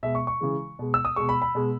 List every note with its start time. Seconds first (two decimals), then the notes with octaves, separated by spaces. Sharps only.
0.03 B2 G#3 E5
0.15 C#6
0.27 C#6
0.41 C#3 E3 G#3
0.79 B2 G#3
0.94 E6
1.05 D#6
1.16 B2 G#3 C#6
1.29 B5
1.42 B5
1.55 B2 G#3